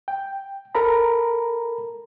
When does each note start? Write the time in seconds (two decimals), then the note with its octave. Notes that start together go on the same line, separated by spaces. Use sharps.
0.08 G5
0.75 A4 A#4 A#5 B5